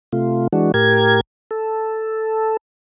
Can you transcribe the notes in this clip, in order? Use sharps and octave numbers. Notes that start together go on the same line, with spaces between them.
C3 A3 F4
E3 G#3 D4 F#4
A2 G4 A#4 G#6
A4